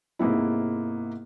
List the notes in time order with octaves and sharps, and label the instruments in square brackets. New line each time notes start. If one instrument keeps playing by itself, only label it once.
[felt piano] G#2 C3 A#3 B3 E4